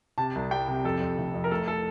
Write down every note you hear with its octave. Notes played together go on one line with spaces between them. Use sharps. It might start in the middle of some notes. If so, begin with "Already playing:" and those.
C3 A5
C2
G3 G5
C3
F2 A4
F2
F1
F2
A#4
A3 A4
A4